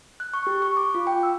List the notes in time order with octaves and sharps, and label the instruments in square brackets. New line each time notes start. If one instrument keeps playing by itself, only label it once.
[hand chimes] F#6
C#6
G4
C#6
D6
F4
G5
E6